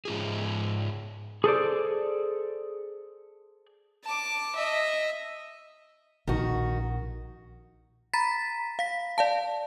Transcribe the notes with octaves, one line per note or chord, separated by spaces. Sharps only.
G#2 F4 G#4
G#4 A4 C5 D5
A5 D6
D#5 E5
A#1 D#3 F#4
A#5 B5 A6 B6
F5 B6
D5 F5 A5